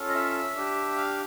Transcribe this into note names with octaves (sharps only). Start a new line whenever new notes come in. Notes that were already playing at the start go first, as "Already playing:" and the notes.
Already playing: C#4 F4 A4
D#5
E5
D4 G4
F5